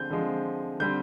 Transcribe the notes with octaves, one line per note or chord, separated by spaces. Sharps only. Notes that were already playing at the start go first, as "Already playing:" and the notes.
Already playing: D3 F3 G#3 C4 G6
D3 F3 G#3 C4
D3 G3 C4 G6